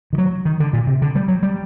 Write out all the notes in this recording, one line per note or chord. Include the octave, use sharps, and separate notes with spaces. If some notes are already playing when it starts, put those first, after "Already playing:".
D#3
F#3
D#3
D3
A#2
C3
D3
G3
F#3
G3